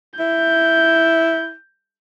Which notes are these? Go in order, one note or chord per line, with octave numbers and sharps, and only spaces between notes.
E4 G6